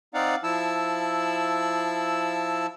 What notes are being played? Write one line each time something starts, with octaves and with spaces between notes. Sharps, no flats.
C4 D#4 D5 F5 F#5
F3 E4 A5 E6